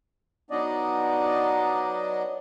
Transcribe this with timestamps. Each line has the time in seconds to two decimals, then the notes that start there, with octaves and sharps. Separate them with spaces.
0.51 F#3 B3 D4 D#4 D5 D#5